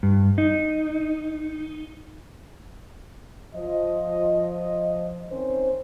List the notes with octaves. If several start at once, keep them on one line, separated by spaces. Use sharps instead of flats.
G2
D#4
F3 D#5
D#3 C4 C#4 C5